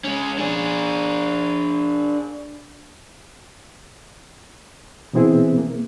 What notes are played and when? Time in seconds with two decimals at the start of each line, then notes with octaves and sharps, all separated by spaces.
0.04 G#3 C#4
0.38 D4 G#4
5.13 B2 E3 B3 C4 E4 G#4
5.58 A#3